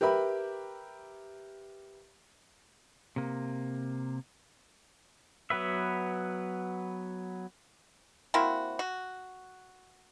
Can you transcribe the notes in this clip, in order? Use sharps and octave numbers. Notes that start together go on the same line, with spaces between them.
G4 A#4 B4 E5 B5
C3 A#3
F#3 B3 B4 E5
A#3 C4 E4 F#4
F#4